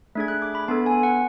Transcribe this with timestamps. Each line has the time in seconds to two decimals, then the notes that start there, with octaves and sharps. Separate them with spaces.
0.15 A3 D4 G#4 G#6
0.28 F#6
0.42 D6
0.55 B5
0.68 B3 D4 A4 A5
0.86 G#5
1.03 F#5